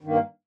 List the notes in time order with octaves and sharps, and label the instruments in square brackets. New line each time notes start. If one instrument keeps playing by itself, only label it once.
[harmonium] D#3
G2
A#3